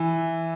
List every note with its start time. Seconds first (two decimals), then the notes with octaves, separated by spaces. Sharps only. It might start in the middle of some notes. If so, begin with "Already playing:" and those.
Already playing: E3